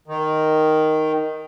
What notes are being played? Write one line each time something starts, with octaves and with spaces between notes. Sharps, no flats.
D#3